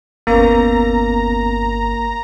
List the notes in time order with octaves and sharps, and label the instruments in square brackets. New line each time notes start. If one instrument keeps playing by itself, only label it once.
[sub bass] G1 [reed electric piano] D#2 B3 C#4 [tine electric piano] A#3 [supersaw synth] A#5